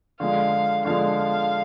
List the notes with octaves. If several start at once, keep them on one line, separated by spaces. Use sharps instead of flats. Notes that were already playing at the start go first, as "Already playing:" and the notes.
D3 F3 G#3 F5
D3 F3 G#3 F5